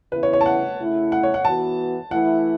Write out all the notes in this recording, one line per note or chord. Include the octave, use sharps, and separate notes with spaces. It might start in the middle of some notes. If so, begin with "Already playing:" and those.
C#3 E3 B3 E4 B4
C#5
C#5
A5
F#5
C#3 A3 E4
F#5
C#5
F#5
E3 B3 F#4 A5
E3 A3 E4 F#5